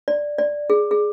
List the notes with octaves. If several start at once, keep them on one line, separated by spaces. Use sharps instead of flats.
D5
D5
G#4
G#4